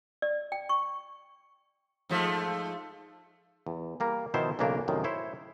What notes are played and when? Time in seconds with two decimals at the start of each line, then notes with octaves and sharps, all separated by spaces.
0.22 D5
0.52 G5
0.69 C#6
2.09 G#2 F3 A3
3.67 E2
4.00 G3 A#3 A#4
4.34 B2 D#3 F3 E4 C5 A5
4.59 B1 C#3 E3 A#3 D4 A#4
4.88 F#2 A2 C3 D#3
5.04 E4 C5 C#5